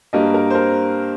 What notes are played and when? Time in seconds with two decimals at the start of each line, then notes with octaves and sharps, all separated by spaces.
0.13 G2 G3 A#3 D#5
0.34 A#4
0.50 C5
0.55 A#4